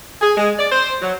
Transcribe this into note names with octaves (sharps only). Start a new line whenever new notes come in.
G#4
G#3
D5
C5
F#3